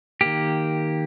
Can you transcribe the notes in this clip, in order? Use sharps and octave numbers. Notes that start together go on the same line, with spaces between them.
D#3 A#3 G4